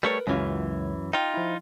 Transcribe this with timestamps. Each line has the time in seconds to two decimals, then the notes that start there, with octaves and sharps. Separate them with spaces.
0.03 G3 A3 A#4 B4 C#5
0.27 C#2 F#2 E3 F#3 G#3 C#4 F4
1.13 D#4 F4 G5
1.34 F3 E4